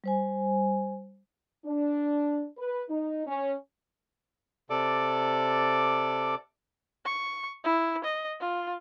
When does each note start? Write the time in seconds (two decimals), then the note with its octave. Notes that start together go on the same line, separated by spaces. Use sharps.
0.04 G3 C5 G#5
1.65 D4
2.58 B4
2.89 D#4
3.27 C#4
4.70 C3 A4 D5 D6
7.05 C#6
7.64 E4
8.04 D#5
8.40 F4